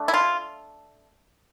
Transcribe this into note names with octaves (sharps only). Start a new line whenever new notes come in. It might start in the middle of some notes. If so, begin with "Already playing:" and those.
Already playing: A3 D4
E4
F4